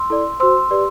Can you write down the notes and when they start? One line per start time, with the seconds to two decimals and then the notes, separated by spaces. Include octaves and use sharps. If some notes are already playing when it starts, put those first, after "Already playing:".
Already playing: C6 E6
0.10 E4 A4 D5
0.40 F#4 C5 C6 E6
0.71 G4 B4 D5